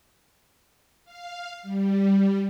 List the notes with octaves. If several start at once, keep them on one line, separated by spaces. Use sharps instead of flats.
F5
G3